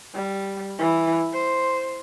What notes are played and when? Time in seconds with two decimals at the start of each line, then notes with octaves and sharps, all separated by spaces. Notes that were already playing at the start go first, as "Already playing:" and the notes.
0.14 G3
0.79 E3
1.33 C5